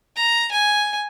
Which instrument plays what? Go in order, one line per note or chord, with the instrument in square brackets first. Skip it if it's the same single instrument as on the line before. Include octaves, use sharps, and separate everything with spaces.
[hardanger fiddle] A#5
G#5